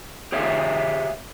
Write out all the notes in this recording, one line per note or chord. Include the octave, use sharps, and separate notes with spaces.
G4 G#4 C#5 E5 F5